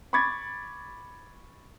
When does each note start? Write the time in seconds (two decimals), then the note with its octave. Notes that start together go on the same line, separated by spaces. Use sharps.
0.13 B5 C#6 D6 G#6 A6